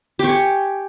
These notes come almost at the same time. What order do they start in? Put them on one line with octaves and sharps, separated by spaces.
G4 C#6 G#5